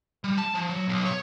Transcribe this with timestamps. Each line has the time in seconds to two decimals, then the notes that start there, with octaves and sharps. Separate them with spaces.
0.24 G3
0.38 A5
0.55 F3
0.69 F#3
0.88 B1
1.06 C#5